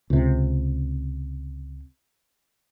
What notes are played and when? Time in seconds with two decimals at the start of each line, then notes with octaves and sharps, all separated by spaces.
0.10 C#2 C3